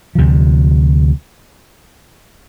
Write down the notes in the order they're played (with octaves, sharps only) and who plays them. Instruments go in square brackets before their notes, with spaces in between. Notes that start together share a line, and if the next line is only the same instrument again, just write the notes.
[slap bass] D2 C3 F3